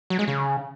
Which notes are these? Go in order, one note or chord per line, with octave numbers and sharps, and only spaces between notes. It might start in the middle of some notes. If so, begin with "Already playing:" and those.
F#3
G#3
C#3